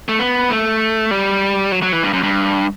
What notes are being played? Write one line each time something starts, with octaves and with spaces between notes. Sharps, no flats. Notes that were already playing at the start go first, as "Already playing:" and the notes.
A3
B3
A3
G3
F#3
F#3
E3
G2
F#2
G2